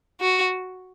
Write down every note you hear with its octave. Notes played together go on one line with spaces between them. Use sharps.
F#4